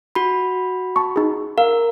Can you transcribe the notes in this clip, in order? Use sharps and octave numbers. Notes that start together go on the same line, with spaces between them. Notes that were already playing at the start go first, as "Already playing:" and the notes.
F#4 B5
A5 C#6
D#4 G#4
A#4 F5